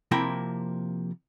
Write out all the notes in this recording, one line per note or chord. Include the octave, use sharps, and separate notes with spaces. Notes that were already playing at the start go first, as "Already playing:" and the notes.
C3 F3 A#3 E4 G5